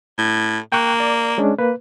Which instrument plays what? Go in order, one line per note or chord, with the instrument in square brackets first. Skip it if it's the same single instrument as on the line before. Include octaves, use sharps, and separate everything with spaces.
[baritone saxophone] A2
[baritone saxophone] A#3 [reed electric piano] G5 C#6 F#6
[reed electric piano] D5
G#3 C#4 D4
A#3 B4